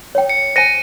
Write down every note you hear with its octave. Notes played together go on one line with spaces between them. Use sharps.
C#5 G5
C#7
C5 G#5 A#6 C#7 D#7